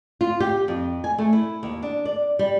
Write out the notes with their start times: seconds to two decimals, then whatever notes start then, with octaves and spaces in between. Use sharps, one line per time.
0.21 F4
0.40 G4
0.68 F2
1.04 G#5
1.18 A3
1.33 E4
1.63 D#2
1.83 D4
2.05 D5
2.39 G3